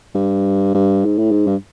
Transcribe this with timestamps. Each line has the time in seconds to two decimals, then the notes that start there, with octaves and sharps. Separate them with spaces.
0.15 G2
0.75 G2
1.05 G#2
1.18 A2
1.31 G#2
1.47 G2